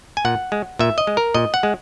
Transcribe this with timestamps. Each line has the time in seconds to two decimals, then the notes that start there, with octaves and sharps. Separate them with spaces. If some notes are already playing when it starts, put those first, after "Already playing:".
0.17 G#5
0.25 A#2 F#5
0.52 G#3
0.79 A#2 E5
0.98 D#5
1.07 G#3
1.17 A#4
1.34 A#2 D#5
1.54 F#5
1.63 G#3